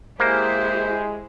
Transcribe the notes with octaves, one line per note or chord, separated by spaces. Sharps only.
G#3 A#3 E4 G4 G#4 C5